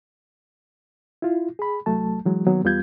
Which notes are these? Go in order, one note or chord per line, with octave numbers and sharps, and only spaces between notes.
E4 F4
G#4 B5
C2 F#3 A3 A5
E3 F#3 G#3
D#3 F#3 A#3 B3
E2 G3 B3 F4 G6 G#6